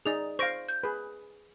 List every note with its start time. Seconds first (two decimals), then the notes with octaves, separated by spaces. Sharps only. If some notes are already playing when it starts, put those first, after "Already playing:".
0.05 D#4 G#4 D5 F7
0.39 C5 F5 C#6 A#6 D7
0.69 G6
0.83 G#4 B4